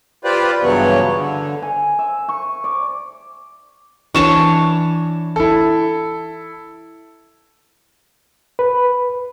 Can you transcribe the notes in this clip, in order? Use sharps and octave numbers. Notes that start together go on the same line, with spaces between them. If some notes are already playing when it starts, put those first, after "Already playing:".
F4 G4 B4 C5 D5
G2 C#3 E3 F#3 B3 C#5
D3
G#5
E5
C#6
D5
E3 D4 C#5 C#6 E7
E4 A4
B4